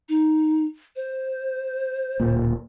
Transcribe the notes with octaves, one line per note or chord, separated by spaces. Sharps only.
D#4
C5
D1 A#2